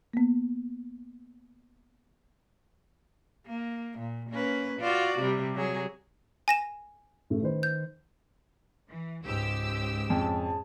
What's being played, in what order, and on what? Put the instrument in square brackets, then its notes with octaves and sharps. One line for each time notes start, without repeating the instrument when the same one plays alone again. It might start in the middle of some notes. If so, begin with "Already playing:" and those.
[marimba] A#3 B3
[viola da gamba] A#3
A#2
A#3 C#4 B4
F4 F#4 D5
C3 G3
F#3 G#4
[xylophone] G#5 A#6 E7
[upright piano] A1 A3
D#3 B4 C5
[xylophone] G6
[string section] E3
[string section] C#2 G4 E6 [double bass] G#2
[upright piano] F2 [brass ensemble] C#4 G#4 A5